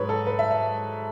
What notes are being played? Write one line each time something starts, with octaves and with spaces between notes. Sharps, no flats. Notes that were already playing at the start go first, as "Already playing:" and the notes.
Already playing: G#2 F#3 B4 C#5
A4
B4
E5
E5